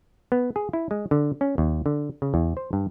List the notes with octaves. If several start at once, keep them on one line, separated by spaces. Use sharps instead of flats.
B3
G#4
E4
G#3
D3
C#4
D#2
D3
C#3
E2
C5
G2